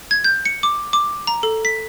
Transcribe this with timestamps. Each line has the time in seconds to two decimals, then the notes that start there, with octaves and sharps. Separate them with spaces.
0.11 G#6
0.24 G6
0.45 C#7
0.63 D6
0.93 D6
1.27 A#5
1.43 A4
1.65 B6